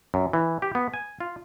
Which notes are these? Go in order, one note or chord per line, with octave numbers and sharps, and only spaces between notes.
F#2
E3
G4
B3
G#5
F4